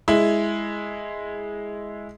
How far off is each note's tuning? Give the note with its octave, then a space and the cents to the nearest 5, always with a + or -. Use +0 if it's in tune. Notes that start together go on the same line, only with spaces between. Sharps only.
G#3 +0 E4 +0